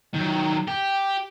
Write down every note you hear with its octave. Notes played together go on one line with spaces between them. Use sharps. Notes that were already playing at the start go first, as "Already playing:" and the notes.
D#3 F#3
G4